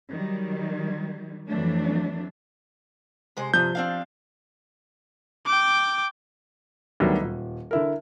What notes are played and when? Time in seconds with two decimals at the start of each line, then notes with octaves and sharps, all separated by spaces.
0.10 D#3 F#3 G3
1.48 F2 E3 F#3 A3 D4
3.37 C3 G#3 C5
3.54 G2 C3 F3 G6
3.75 C4 D4 F5
5.46 G5 D6
7.00 D2 D#3 F#3 G3 B3
7.22 D#1
7.71 D3 E4 A#4